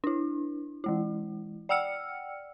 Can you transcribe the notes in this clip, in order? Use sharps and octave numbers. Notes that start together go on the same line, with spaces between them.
D4 E4
E3 G#3 E4
D5 F#5 G5 E6 F6 C#7